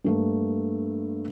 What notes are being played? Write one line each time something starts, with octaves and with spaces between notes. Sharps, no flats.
G2 A3 A#3